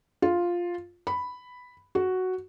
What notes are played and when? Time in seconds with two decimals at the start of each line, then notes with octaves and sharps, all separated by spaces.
0.22 F4
1.07 B5
1.95 F#4